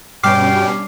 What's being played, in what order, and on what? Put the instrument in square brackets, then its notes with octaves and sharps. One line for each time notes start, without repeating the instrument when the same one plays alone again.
[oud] G2 [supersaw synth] B2 G3 C#4 [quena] G5 [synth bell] D6 F6 C7